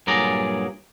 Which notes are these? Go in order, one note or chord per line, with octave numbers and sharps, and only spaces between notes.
G2 A#2 F#3 G#4 D5 A#5